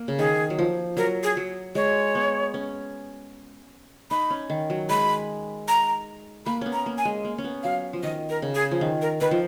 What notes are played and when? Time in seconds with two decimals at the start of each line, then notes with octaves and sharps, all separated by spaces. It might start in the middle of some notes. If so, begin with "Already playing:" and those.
Already playing: A#3
0.08 C#3
0.19 D#3 G#4
0.50 F#3
0.59 F3
0.97 F#3 A#4
1.23 G#4
1.37 F#3
1.75 G#3 C#5
2.15 B3
2.54 C#4
4.11 D#4 B5
4.30 C#4
4.50 D#3
4.70 F#3
4.89 G#3 B5
5.68 A#5
6.46 A#3 B5
6.61 B3 C#4
6.73 A#5
6.86 A#3
6.98 G#5
7.05 G#3
7.25 A#3
7.38 C#4
7.44 B3
7.63 F#3 F5
7.93 F3
8.03 D#3 D#5
8.30 A#4
8.42 C#3
8.55 G#4
8.71 F3
8.81 D#3
9.02 A#4
9.21 D#3 B4
9.31 F3